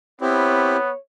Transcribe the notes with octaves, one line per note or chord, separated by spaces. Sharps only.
B3 C4 E4 G4 C#5